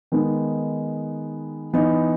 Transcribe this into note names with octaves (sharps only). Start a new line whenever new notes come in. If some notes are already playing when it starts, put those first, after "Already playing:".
D#3 G#3 B3 D#4
E3 B3 D#4